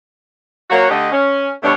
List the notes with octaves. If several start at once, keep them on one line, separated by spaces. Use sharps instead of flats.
F#3 A#3 F#4 C#5
D3 A3 G4 D#5
C#4
G2 B2 G3 A3 D4 C#5